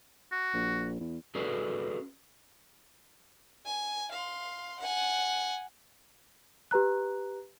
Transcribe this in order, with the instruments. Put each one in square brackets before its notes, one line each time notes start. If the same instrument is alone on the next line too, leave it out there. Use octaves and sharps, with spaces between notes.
[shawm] F#4
[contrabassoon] A#1
E2
[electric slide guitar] C#4 F#4 G#4 A4 B4 D5
[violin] G#5
F5 C6
F#5 G#5
[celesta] G4 B4 A#5 F#6